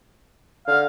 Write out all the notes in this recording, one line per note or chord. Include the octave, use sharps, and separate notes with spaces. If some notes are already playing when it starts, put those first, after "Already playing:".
D3 F5